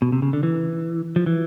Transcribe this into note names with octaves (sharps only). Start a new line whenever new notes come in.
B2
C3
C#3
D3
E3
F3
E3